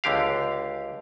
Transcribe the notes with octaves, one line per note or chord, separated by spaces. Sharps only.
C#2 D3 G4 F5